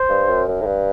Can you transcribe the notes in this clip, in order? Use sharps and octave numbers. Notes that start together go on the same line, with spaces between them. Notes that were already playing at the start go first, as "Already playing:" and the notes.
Already playing: C5
G2
F#2
F#2
A2
G2